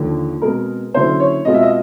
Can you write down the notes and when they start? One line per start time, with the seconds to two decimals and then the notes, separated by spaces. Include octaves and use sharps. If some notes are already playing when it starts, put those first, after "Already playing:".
Already playing: D#2 D3 F3 A#3
0.42 B2 G#3 C4 A#4
0.94 D3 F#3 A#3 C#4 E4 C5
1.20 C#5
1.45 B2 G#3 C4 F4 D#5
1.54 E5
1.63 D#5